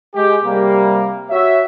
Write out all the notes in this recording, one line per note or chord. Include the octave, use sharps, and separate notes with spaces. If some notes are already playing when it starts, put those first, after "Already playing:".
G#3 G4
C3 G3 A#3
F#4 C#5 E5